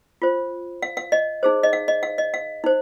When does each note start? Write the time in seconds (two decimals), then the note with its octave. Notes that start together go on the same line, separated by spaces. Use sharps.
0.22 F4 C5
0.82 F5
0.97 F5
1.12 D#5
1.43 D#4 G#4 C5
1.63 D#5
1.73 F5
1.88 D#5
2.03 F5
2.18 D#5
2.34 F5
2.64 D#4 C5